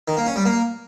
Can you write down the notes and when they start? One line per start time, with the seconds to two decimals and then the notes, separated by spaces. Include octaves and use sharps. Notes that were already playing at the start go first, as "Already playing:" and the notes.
0.08 D#3
0.17 A#3
0.26 C#4
0.36 G3
0.45 A#3